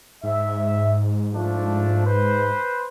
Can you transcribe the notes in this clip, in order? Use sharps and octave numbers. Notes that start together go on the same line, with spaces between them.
G#2 E5
F3 A3 D4
B4 C5